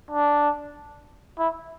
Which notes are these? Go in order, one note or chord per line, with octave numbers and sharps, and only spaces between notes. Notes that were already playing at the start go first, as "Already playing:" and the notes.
D4
E4